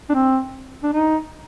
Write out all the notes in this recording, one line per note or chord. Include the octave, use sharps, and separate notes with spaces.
D4
C4
D4
D#4